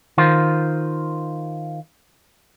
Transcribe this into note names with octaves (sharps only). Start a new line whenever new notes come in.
D#3 F4 A#4 C5